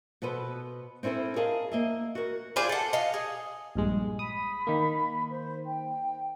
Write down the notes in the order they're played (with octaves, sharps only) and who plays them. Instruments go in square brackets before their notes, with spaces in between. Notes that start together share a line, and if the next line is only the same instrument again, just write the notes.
[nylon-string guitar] B2 B3 A4 B4 C5
C4 C#4 E4 A4 C5
G#4 A#4 D#5 F5 A5
A#3 D#5 E5
F#4 A#4
[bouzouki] F4 G#4 C5 D5
A4 F#5
D#5 F5
G#4
[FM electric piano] A#1 G2 G#3
[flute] B5 [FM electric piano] D#6
[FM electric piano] D#3 A#3
[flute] C5
G5